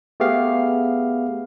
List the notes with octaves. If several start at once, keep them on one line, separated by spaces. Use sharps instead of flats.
A3 B3 G4 G#4 F5